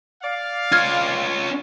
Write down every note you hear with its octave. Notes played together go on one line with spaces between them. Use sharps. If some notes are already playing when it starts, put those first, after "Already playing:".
D5 F5
C#4 F4 F6 G#6 A6